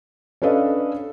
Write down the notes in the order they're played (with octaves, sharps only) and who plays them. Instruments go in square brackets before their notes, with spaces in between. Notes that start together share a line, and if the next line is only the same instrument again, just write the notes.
[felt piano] C#4 D4 A4 B4 D#5 F5